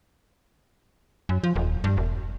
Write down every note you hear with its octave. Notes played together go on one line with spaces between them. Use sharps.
F#2
F3
D#1
G2
E1